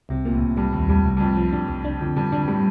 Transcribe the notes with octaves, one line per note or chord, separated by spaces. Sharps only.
C2 C3
A#2 A#3
A2
C2
G2 G3
D#2 A2
G2 G3
C2 A2
G2
C2 F2
F3
G2 D4
C2
D4
F2 D3
G2 D3
G2 D4
G2
A2 G3